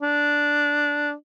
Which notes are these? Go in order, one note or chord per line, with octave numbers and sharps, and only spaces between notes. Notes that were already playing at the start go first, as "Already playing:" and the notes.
D4